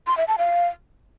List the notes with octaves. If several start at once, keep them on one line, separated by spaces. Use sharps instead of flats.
C6
E5
A5
F5